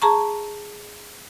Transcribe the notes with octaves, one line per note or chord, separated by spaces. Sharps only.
G#4 A5 A#5 C#6